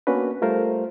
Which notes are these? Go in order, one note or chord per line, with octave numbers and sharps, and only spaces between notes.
A#3 B3 C#4 D4 F#4 B4
G3 A3 F4 A#4 C5